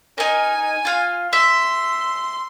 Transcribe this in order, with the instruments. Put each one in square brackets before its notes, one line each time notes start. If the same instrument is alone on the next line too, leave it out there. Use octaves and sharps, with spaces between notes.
[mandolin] D#4 A#4 [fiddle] G#5
[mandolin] F4 F5
[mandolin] E5 [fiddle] C6